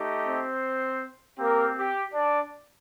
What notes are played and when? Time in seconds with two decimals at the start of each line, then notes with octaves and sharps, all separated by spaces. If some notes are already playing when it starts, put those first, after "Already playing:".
Already playing: A3 D#4 G4
0.27 C4 C5
1.39 A#3 C4 G4 A#4
1.77 G4
2.14 D4 D5